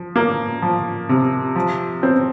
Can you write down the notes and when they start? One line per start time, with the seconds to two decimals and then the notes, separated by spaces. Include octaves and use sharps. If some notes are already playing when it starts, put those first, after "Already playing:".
Already playing: F3
0.16 A#3
0.62 F3
1.09 C3
1.56 F3
2.03 C4